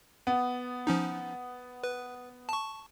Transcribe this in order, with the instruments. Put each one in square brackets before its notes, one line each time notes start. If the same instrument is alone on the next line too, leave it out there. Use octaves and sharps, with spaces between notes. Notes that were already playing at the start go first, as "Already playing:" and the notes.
[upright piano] B3
[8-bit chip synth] F3 C#4 D#4
B4
A5 C#6